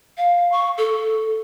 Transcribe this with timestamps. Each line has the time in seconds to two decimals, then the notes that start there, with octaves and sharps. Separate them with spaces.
0.18 F5
0.52 C#6
0.78 A4